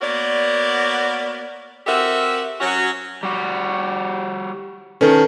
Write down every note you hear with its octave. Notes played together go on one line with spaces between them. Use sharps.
A#3 B3 F#4 A#4 C#5 D5
C4 F#4 G4 A4 A#4 E5
F#3 C#4 F#4
G3 F#4
D#3 C#4 A4 B4